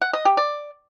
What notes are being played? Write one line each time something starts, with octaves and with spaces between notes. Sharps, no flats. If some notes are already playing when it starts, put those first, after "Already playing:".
F#5
D#5
G4
D5